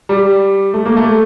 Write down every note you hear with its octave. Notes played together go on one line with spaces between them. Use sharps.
G3
A3
A#3
A3